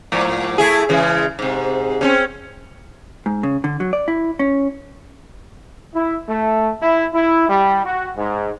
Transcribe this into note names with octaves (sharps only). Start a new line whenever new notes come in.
G#2 F3 A#3
A3 E4 G#4
C#3 E3 G#3
G#2 C3
C#3 C4 C#4
G#2
C#3
D3
F#3
D5
E4
C#4
E4
A3
E4
E4
G3
F#4
G#2